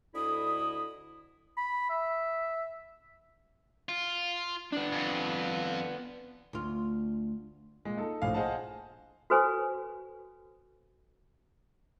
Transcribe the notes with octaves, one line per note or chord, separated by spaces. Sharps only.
D2 D3 E4 D#5 B5 D#6
B5
E5
F4
B3 D4
F2
D2 F4
A#2 G#3
D#4 A4
A#1 A2 F5 G#5
G#4 C5 D#5 F5 F#5 A5
F#4 A4 B4 C5 G#5 C#6